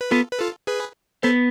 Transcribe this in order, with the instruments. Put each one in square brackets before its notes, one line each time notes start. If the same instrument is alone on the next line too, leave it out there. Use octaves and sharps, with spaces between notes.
[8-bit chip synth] B4
[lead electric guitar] B3 [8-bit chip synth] F4 A4
[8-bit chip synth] B4
F4 A4
G#4 B4
[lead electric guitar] B3 [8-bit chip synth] A4 C5